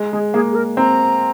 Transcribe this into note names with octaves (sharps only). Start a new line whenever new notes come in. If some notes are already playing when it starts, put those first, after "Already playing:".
Already playing: G#3
G#3 G#4
A#3 G#4
G#4
A#4
C4 A#5